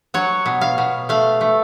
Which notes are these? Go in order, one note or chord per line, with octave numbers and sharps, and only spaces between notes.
F#3 C#5
B2
F5
B2
A3 F5
A3